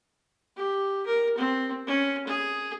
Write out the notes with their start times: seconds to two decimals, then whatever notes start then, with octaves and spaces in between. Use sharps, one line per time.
0.57 G4
1.06 A#4
1.37 C4
1.87 C#4
2.27 G#4